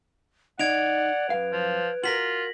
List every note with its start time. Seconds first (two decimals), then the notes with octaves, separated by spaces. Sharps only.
0.59 D#4 D5 F#5 G#6 D7 F7
1.30 F#2 B4 F5
1.52 F3
2.04 F4 F#4 A#4 A#6 B6 F#7